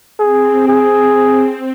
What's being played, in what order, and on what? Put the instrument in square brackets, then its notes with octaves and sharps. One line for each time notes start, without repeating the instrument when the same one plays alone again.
[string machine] C4 [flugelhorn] G#4
[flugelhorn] G#4